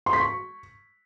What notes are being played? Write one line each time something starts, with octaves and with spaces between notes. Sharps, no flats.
C6
B6
C#6